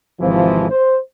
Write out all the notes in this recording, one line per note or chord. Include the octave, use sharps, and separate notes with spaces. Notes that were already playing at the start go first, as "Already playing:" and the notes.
G#1 C3 E3 F3
C5